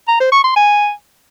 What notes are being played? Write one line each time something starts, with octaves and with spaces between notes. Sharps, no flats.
A#5
C5
C#6
C6
G#5